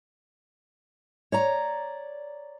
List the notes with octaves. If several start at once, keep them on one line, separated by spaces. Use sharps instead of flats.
C#5 D5 A#5